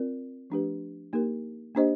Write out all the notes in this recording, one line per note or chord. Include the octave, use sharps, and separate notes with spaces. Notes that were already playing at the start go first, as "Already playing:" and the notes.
Already playing: C4 F4 A#4 D5
F3 A3 D4 G4 B4
A#3 D#4 G4 A#4
A#3 D4 G4 C5 D#5